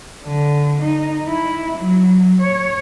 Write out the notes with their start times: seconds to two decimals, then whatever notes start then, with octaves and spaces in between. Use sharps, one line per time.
0.25 D3
0.81 D#4
1.28 E4
1.78 F#3
2.41 C#5